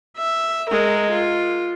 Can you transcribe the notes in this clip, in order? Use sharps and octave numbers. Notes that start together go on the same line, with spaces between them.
E5
G#3 A#4
F4